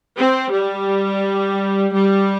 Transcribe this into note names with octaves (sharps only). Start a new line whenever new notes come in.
C4
G3
G3